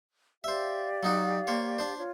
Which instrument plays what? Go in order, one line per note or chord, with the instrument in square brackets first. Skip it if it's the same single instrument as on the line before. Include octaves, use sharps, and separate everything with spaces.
[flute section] G4 D5 F5 [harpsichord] C5 E5
[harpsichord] F#3 D#4 F#4
A#3 C5 C#5
D4 C5
[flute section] F4 C#5